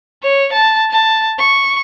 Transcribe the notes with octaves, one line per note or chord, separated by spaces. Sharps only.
C#5
A5
A5
C#6